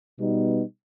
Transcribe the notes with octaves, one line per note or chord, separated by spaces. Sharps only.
B2 G3 B3 D#4